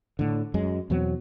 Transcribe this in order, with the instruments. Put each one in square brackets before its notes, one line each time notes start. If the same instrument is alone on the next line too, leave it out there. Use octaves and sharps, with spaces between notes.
[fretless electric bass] A2 D3
F#2 G#3
E2 B2 F#3 C4